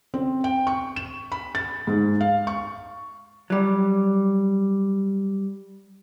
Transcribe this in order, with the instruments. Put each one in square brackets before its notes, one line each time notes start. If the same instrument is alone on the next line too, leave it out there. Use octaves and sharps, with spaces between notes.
[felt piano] C4
G5
C#6
E7
B5
A6
G#2
F5
C#6
[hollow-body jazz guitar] F#3 G3